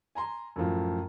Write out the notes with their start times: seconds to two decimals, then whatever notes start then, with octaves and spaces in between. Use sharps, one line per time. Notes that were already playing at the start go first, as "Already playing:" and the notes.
0.15 G#5 A#5 C6
0.56 F#2 A2 F3